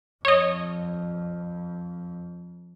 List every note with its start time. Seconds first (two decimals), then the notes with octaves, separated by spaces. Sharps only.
0.25 F2 C#5 D#5